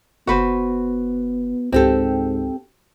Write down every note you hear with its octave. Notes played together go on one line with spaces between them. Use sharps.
F#1 B3 F#4 B4 C5
C#2 G#2 C4 G4 A4